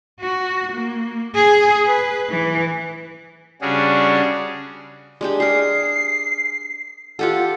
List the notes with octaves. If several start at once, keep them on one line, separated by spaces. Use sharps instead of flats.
F#4
A#3
G#4
B4
E3
C#3 G3 C#4 D4 F#4 G#4
G#3 D4 G4
G#4 A#4 C7
F4 G4 A4 F#5